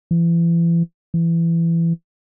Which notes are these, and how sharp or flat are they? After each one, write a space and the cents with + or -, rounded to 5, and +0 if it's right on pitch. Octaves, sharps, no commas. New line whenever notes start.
E3 +35
E3 +20